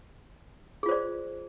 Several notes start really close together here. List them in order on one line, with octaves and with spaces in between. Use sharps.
G#4 F4 C5 D5